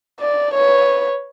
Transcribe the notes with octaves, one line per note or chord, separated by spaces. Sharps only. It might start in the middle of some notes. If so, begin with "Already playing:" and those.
D5
B4 C#5